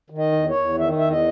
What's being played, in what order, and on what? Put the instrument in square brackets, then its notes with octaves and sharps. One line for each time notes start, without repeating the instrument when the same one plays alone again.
[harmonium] D#3
D#5
E2
C#5
E2
D#3 E5
E2 E5
D#5